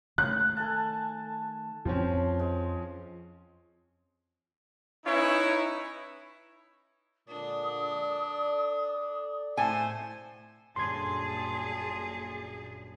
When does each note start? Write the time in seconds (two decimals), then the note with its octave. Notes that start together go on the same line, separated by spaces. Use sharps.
0.18 D#3 A3 F#6
0.57 A4 G#5 A5
1.85 F2 F3 C4 C#4
2.39 G#3
5.05 C#4 D#4 E4 B4 C#5
7.28 A#2 D3 G#3 D4 D#6
7.96 A4 D5
9.57 A2 C5 G#5
10.76 G1 F#2 A#2 G#4 A5 C6 G#6